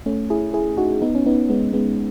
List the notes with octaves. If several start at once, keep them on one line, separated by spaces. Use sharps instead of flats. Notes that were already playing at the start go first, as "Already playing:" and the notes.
A3 C#4
E4 G#4
E4 G#4
D#4 F#4
B3 D#4
C#4
B3 D#4
G#3 B3
G#3 B3